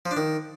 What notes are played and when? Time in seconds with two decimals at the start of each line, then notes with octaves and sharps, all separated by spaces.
0.06 F3
0.11 D4
0.17 D#3